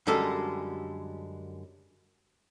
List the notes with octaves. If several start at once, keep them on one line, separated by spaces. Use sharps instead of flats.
F#2 D3 G3 G#3 A4